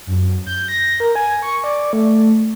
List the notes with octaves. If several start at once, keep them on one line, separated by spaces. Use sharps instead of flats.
F#2
G6
A#6
A#4
G#5
C#6
D5
A3